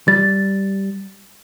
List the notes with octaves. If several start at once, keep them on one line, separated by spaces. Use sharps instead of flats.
G3 A6